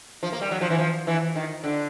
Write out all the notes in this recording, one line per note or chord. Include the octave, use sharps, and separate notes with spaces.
F3
A#3
G3
F#3
F3
E3
F3
E3
D#3
D3